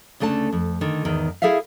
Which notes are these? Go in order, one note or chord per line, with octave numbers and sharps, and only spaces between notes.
D2 C#3 A3 D4 A5
F2
D3 D#3
E2 G#2 D#3
E4 G#4 A4 E5 F5